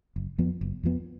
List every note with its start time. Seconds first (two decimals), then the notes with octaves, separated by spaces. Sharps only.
0.16 F#1
0.38 F2 F3 B3
0.61 F#1
0.83 F2 F3 B3